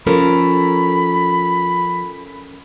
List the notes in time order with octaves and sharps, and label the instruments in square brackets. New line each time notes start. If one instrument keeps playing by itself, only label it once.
[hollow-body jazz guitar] F3 [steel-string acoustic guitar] C#4 A4 A#4 [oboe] B5